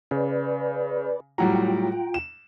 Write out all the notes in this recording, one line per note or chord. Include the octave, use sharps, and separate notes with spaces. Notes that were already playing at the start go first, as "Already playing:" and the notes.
C#3 B4 D5
A2 F#3 G3 F4 F#5 G5 A#5
E7